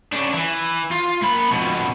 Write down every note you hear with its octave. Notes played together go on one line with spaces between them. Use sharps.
C#3 D4
E3
F4
A#3 B5
F2 B2